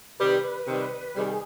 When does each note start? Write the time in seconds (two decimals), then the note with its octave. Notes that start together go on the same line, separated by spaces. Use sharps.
0.19 C3 D#3 G3 B4
0.68 C3 D#3 G3
1.16 C3 D#3 G3 G#4